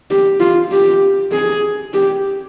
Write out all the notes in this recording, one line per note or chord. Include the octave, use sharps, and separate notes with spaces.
G4
F4
G4
G#4
G4